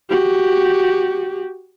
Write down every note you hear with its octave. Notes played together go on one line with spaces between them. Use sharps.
F#4 G4